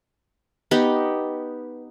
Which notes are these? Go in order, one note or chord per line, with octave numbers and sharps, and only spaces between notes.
B3 D#4 G4 B4